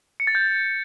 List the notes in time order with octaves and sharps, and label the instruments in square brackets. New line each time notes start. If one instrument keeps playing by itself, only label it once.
[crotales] C#7
A6
G6